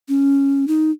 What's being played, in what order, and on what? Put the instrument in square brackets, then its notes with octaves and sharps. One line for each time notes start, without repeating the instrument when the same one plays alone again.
[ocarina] C#4
D#4